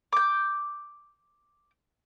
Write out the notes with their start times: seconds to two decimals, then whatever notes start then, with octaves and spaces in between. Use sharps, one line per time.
0.12 D6 G6